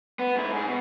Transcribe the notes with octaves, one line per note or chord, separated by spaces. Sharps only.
B3
G#2 E4
G#2 G#4
B2